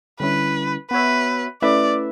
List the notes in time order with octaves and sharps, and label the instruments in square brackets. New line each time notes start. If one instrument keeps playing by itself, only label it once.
[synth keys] D3 G3 C#4 E4 [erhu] B4
[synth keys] B3 F#4 C#5 E5 [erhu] B4
[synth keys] A3 C#4 E4 B4 E5 [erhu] D5